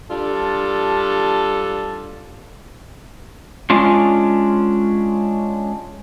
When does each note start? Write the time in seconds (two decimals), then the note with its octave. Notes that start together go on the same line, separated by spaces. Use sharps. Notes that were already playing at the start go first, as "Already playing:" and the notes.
0.11 G3 D4 F4 A4
3.70 G#3 C#4 D4 F4